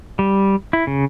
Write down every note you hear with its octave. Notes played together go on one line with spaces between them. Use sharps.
G3
E4
C#3